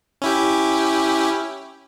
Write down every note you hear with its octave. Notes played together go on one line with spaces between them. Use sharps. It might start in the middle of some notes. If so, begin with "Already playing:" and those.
C#4 E4 G4